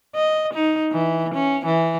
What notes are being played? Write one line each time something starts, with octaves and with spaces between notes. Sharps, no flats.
D#5
D#4
E3
C#4
E3